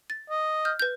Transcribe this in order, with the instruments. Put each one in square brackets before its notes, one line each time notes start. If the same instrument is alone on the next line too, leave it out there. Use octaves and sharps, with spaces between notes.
[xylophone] A6
[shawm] D#5
[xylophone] F6 G6
B4 G6